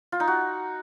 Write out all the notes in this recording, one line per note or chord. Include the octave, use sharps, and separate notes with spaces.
F4
D#4
F#4